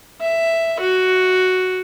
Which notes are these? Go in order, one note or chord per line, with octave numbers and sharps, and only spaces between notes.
E5
F#4